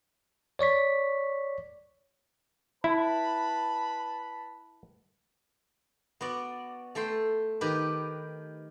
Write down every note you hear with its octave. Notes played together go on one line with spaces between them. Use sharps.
C#5 D5 C#6 B6
E4 B4 A5 B5
B3 F#4 D5
A3 A4 G5 C6
D#3 G4 B4